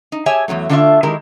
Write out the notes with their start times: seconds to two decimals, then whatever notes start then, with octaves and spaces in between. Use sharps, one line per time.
0.12 D#4
0.26 G4 G#4 C#5 E5 G#5 A5
0.48 E2 G#2 F#3 A3
0.69 D3 A3 D4 F4 C#5 E5
1.03 D#3 G#3 E4 G4 A#4